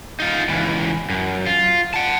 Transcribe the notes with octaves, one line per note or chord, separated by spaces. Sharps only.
D#4 F4
C#2 E3
F#2
F4
F#5 A5